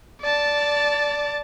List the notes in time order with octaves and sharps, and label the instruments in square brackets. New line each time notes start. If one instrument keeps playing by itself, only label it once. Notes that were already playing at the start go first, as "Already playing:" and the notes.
[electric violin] D5 A5